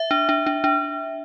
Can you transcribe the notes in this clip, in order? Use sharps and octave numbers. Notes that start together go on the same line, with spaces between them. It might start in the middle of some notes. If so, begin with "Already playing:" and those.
Already playing: E5
D4
D4
D4
D4